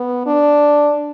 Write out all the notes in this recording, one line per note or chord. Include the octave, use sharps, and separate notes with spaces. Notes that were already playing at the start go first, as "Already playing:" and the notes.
Already playing: B3
D4